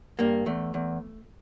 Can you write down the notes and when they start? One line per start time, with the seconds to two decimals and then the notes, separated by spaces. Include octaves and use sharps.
0.19 G2 A#3
0.46 E2 A3
0.74 E2